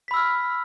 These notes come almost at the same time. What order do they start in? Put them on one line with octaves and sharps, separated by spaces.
B6 B5 E6 F6